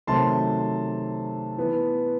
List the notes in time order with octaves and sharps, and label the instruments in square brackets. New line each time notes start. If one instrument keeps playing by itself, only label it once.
[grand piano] C3 D#3 F#3 A3 C4 A5 C6
E3 B3